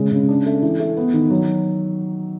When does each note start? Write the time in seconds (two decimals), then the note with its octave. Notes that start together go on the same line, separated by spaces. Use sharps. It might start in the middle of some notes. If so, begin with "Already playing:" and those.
Already playing: C#3 G#3
0.12 C#3
0.28 D4
0.46 A3
0.63 E3
0.80 A3
0.97 B3
1.14 D#3
1.30 F#3